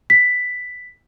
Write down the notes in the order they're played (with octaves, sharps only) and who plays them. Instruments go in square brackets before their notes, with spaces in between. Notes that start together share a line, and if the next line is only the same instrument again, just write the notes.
[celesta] B6